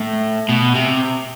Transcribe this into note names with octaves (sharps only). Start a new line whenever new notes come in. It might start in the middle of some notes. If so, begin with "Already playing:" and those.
Already playing: A2
B2
C3